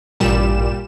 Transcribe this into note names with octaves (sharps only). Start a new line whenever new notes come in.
A1 G2 A#2 G3 E7